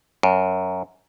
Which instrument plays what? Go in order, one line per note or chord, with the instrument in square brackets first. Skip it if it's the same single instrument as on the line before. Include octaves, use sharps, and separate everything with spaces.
[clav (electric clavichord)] F#2